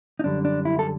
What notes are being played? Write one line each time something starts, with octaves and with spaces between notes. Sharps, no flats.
D#4
F#2 D3 G3 D4
D4
E4
A4